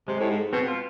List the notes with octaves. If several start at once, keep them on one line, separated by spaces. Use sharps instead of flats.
C3 G#3
A2
G#2
B2 C4
F4